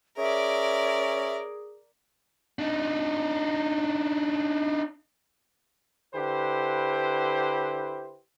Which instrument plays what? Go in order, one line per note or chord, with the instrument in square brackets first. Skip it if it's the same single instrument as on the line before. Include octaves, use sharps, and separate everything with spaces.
[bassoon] C#4 [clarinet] G#4 [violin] A#4 D5 [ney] E5
[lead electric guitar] D4 D#4
[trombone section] D3 E4 G4 B4 C5